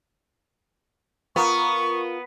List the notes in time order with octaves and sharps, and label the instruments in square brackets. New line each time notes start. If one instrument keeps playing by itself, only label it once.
[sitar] B3 [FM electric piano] F4 A#4 [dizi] C#6